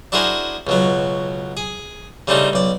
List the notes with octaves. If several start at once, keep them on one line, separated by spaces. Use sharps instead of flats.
D4 E4 F#4 G#4 A#4 C5
C#2 B2 F#3
G#4
C#3 G3 A3 C4 D4 D#4
B1 D5